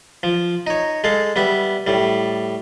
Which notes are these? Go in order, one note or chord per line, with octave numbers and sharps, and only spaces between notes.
F3
D#4 C#5
G#3 A4 F5
G3 B3 E5
A2 G3